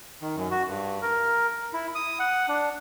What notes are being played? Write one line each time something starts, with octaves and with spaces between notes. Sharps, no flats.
D#3
F#2
F#4
G2
A#4
E4
D#6
F#5
D4